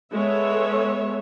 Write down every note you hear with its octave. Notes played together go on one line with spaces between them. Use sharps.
G#3 B3 A4 C#5 E5